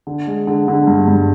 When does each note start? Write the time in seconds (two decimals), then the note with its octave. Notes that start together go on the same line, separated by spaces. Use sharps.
0.07 D3
0.27 G#3
0.47 D3
0.68 D3
0.87 G2
1.08 G2